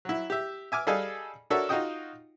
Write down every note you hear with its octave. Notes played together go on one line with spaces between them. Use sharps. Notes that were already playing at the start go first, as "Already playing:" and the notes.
F#3 E4
G4 E5
E5 G#5 D6 F6
G3 G#4 A4 D#5 F5 G#5
D4 F#4 A4 A#4 C#5 E5
D#4 F4 F#4 D#5 G5 D#6